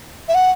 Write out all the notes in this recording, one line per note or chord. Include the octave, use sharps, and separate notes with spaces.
E5
F#5